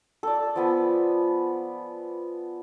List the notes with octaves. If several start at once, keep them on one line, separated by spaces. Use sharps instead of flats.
A4 D5
F3 B3 G#5